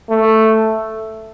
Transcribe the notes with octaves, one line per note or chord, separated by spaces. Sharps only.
A3